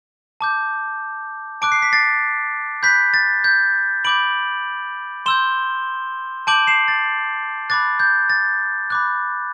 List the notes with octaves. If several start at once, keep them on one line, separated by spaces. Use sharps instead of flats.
A5 D6 G6
A5 D6 F#6 D7
C7
B6
A6 C7
B5 F#6 G6 B6
A6
G6
B5 D6 G6 D7 F#7
C6 E6 G6 E7 G7
A5 D6 G6 D7 F#7
C7 E7
A6
B5 D6 F#6 A6
G6
A6
B5 D6 F#6